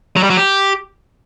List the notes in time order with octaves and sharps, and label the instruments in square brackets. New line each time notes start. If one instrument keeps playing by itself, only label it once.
[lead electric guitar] F#3
G3
F#3
G4